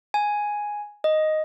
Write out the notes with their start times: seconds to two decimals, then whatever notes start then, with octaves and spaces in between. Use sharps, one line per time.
0.14 G#5
1.04 D#5